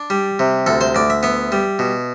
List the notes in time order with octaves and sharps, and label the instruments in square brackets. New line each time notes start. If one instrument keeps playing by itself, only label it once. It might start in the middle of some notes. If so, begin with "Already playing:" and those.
Already playing: [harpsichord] D4
G3
C3
D2 A4
C5
D2 D5
E5
B3 E5
G3
B2